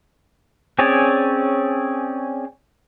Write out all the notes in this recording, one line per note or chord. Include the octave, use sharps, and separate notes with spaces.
C4 C#4 G#4 C#5 D5